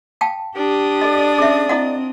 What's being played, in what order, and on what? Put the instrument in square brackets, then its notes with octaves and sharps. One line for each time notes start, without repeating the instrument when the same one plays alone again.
[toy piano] F5 G5 A5
[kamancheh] D4 D#6 [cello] G4
[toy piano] A4 D#5 [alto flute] D5
[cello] C#4 [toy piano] G#4 E5
[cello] C4 [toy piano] E4 D#5 F#5